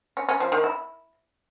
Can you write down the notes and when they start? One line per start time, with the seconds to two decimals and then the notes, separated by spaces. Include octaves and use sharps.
0.17 C#4
0.29 C#4
0.40 F3
0.52 D#3
0.64 E4